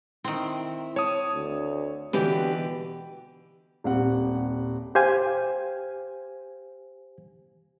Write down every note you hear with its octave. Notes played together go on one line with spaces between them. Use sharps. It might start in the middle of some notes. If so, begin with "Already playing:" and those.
D#3 C4 E4
C#5 A5 D#6
D2
B2 D3 E3 G4 B4
D#1 G3 C4 F#5
G4 C5 F5 G#5